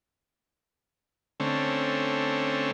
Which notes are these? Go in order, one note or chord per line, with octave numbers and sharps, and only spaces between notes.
D3 A3 C4 C#4